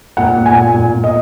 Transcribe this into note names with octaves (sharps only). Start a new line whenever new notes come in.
A#2 F#5
A#2
G#5
A#2
A#2
A#2
D#5